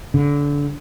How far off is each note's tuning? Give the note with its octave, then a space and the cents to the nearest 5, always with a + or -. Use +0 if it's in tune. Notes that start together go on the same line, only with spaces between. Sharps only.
D3 -30